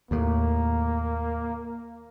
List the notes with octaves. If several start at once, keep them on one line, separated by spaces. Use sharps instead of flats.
D#2 A2 A#3